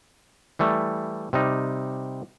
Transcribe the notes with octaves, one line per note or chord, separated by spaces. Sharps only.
E3 G3 A3
C3 G3 D#4